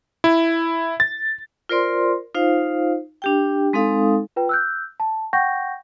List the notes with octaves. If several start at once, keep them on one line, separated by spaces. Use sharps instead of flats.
E4
A6
F4 A#4 C5 D5 C6
D#4 F4 C5 F5
D4 G4 G5
G#3 C4 D#4 A4 F5 D#6
F4 B4 G5
E6 F#6 G6
A5
F#5 G5 C#6 G6 A#6